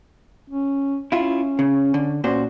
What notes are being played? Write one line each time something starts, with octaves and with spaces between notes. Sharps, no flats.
C#4
C#4 E4 F4
C#3
D3
A#2 C#4 F#4 C5